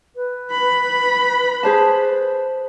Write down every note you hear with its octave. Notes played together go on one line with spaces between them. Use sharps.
B4
B5
G#4 C5 A5